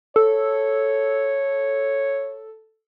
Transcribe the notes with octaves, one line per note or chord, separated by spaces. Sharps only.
A4 C#5